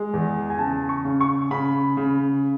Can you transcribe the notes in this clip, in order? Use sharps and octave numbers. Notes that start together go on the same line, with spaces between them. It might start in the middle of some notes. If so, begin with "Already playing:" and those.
Already playing: G#3
E2
G#5
C#3 A5
C#6
C#3
C#6
C#3 B5
C#3